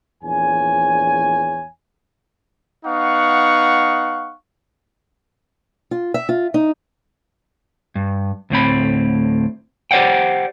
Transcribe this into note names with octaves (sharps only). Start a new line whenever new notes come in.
A#1 E2 C#5 G#5
B3 D#4 F5 F#5 C#6
F4
E5
F4
D#4
G2
D2 A2 C4 B5
G4 C5 D5 F#5 G5